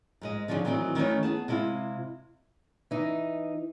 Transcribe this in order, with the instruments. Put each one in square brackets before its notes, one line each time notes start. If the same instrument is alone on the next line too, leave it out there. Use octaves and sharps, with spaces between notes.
[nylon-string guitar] G#2 G#3 D#5
D3 F3 F#3 D#4 G4 G#4
D#3 E3 F#3 C4 D#4
D#3 E3 A3 C#4
B3 G#4 A5
C3 G#3 E4 F4
[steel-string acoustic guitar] E3 D#4